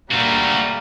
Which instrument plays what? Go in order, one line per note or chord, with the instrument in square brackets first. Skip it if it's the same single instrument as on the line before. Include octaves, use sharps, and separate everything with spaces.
[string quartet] A#2 G3 A#3 [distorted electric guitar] A3 F#4